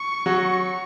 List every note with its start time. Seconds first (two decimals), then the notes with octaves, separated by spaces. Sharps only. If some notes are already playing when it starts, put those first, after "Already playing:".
Already playing: C#6
0.26 F#3 F#4